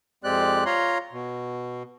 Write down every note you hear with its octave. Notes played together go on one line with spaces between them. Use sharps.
F2 G#3 C4 G4 D5 F#6
F4 C#5 A#5 C6
B2